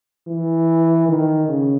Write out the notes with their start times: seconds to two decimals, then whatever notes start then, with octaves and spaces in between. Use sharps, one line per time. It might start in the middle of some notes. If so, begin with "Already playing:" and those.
0.27 E3
1.09 D#3
1.49 C#3